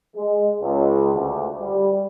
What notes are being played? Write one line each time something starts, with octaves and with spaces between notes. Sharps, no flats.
G#3
C#2
D2
G3